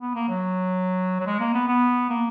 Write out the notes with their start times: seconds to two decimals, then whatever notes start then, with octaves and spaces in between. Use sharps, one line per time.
0.01 B3
0.15 A#3
0.29 F#3
1.20 F#3
1.26 G#3
1.40 A#3
1.54 B3
1.68 B3
2.09 A#3